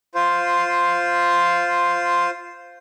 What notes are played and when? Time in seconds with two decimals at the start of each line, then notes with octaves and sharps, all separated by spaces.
0.15 F4 C5